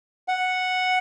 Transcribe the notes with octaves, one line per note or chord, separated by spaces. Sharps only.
F#5